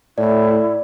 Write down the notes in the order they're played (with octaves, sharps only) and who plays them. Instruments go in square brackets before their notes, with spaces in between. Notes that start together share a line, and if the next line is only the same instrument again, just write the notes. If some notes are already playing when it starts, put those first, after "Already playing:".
[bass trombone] A2 [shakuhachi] E4 [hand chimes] D5